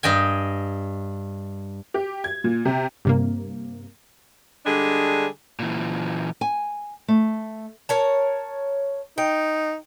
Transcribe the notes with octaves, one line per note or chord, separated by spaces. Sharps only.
G2 D#5 G5 G#5
G4
G#6
A#2
C3
G2 C3 A#3
D3 G3 G#3 D4 G#4
A#2 E3
G#5
A3
A#4 C#5 A5
D#4 G5